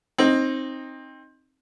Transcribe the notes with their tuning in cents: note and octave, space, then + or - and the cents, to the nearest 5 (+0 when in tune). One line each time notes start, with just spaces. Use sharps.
C4 +20 D#4 +0